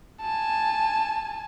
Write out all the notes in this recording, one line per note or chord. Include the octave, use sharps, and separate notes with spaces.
G#5 A5